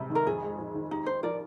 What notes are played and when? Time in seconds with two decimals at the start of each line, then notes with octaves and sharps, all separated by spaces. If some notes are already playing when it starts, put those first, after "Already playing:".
Already playing: C3 G3 G#3
0.10 D#3
0.15 A#4
0.27 F2 G#4
0.42 G#3
0.58 F2
0.74 D#3
0.91 D#4 G4
1.06 D4 C5
1.23 F3 A#4 D5